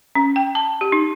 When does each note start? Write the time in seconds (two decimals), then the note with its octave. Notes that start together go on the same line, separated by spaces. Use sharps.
0.15 C#4
0.36 G5
0.55 A5
0.81 G4
0.92 D#4